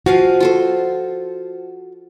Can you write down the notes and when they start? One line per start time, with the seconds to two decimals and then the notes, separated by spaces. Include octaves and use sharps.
0.06 F3 F#4 F5 G#5
0.40 F4 A4 C5